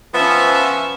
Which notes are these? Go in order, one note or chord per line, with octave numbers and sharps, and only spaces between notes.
F3 B3 C#4 E5